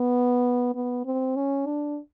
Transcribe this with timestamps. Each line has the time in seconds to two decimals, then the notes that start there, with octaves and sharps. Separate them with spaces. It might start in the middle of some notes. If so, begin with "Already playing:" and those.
Already playing: B3
0.75 B3
1.05 C4
1.36 C#4
1.66 D4